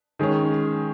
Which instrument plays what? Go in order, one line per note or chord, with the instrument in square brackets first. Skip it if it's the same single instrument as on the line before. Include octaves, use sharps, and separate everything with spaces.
[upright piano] D#3 G#3 C#4